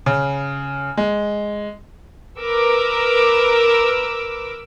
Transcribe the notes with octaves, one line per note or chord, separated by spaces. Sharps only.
C#3
G#3
A#4 B4 D6 E6